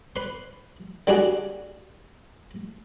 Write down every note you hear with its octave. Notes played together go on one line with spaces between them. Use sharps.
B4 C6
D3 G3 A#3 D4 F#4 G#4